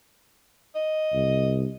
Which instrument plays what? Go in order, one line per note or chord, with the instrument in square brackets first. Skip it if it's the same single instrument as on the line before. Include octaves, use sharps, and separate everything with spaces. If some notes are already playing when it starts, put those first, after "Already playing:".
[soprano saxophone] D#5
[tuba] C2